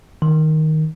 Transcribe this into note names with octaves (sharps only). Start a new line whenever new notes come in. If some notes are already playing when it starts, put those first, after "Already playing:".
D#3